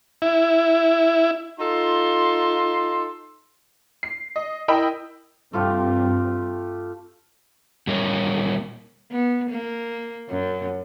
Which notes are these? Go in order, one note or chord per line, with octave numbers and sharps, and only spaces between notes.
E4
D#4 F4 A4 C6
C7
D#5
E4 A#4 D#5 G5 B5 E6
G2 C3 A3 C4 F4 G4
A#2 G3 A#4 C#5
B3
A#3
F#2